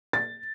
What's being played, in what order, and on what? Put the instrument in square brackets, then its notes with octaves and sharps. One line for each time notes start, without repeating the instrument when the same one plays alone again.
[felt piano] A6